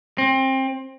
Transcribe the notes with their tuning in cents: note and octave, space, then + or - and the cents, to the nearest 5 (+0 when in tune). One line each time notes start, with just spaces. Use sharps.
C4 +25